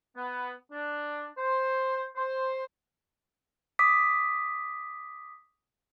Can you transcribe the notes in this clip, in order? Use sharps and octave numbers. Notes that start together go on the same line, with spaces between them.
B3
D4
C5
C5
D6 D#6 B6